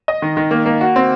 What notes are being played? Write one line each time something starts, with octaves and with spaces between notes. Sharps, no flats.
D#5
D#3
D#3
A#3
A#3
F#4
C4